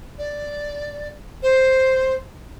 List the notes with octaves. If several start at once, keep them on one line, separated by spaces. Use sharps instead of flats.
D5
C5